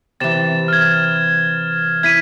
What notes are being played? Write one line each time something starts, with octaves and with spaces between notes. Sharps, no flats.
C3 E3 A6 E7
F6 G#6
E4 G#6 B6 D#7